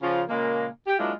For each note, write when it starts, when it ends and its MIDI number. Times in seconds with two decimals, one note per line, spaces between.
0.02 0.22 49
0.02 0.22 53
0.02 0.22 65
0.29 0.66 46
0.29 0.66 49
0.29 0.66 56
0.29 0.66 58
0.87 0.96 67
0.99 1.12 54
0.99 1.12 56
0.99 1.12 58
0.99 1.12 62
0.99 1.12 64
0.99 1.12 65